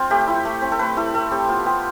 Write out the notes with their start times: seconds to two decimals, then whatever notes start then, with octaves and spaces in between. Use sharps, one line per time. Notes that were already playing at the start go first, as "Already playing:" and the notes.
Already playing: C4 F4
0.10 A3 G4
0.28 E4
0.45 A3
0.62 C4
0.72 A4
0.79 A3 B4
0.97 E4 A4
1.14 A3 A4
1.31 C4 G4
1.48 B3 F4
1.66 B3 G4